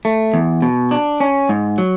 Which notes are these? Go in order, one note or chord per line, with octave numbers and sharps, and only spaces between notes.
A3
E2
B2
D4
C#4
G#2
F#3